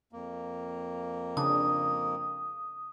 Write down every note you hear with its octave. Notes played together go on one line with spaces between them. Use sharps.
F2 A#3
C#3 D4 D#6